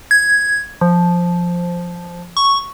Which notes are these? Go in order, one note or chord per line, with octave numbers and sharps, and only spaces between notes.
G#6
F3
C#6